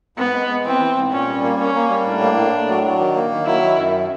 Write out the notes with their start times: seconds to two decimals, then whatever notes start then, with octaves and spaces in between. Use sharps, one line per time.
0.17 G#2 B3
0.33 G#3
0.49 G#3
0.64 E3 C4
0.80 E3
0.96 G#2
1.11 A#2 C#4
1.27 G3
1.43 A#3
1.58 A#3 C#4
1.75 A#3
1.89 G3
2.05 A2 D4
2.21 A#3
2.37 A2
2.52 A2
2.69 F#3
2.84 F#3
2.99 D#3
3.15 A#3
3.31 D#3
3.46 F#3 E4
3.62 D#3
3.77 F#2